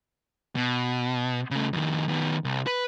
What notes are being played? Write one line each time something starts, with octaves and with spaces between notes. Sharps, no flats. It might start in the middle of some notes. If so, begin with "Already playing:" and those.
B2
C#3 A3
F2 D#3
D#3 B3
C2
B4